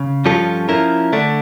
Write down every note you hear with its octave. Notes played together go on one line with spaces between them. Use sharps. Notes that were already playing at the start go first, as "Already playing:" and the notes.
Already playing: C#3
G2 F3 C#4 F4 A4
F3 C#4 E4 A#4
D3 A3 D4